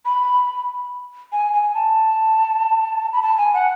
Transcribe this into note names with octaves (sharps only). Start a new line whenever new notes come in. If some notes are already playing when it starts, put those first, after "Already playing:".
B5
G#5
G#5
A5
B5
A5
G#5
F#5